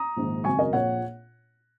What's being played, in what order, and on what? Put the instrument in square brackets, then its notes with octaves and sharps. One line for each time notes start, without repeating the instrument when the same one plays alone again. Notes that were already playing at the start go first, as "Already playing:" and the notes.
Already playing: [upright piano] A#5 D#6
A#1 G#2 D#3
G#1 F#2 C#3 G#5 C#6
A#4 D#5
A#1 A#2 C#5 F#5